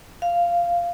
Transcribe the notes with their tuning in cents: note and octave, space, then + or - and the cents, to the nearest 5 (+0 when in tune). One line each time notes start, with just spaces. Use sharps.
F5 -10